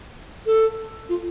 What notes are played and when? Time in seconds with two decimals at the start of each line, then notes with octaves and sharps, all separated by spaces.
0.46 A4
1.09 F4